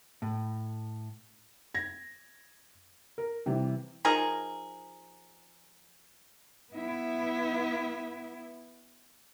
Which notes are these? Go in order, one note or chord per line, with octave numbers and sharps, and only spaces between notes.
A2
G#6 A#6
A#4
C3 E3 G3
F3 D#4 G#4 A#4
B3 E4